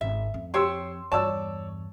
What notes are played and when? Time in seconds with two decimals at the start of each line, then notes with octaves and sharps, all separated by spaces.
0.01 G#1 E5
0.34 F2
0.54 G4 C5 C#5 C6 E6
1.12 E2 G2 C#5 D5 A5 E6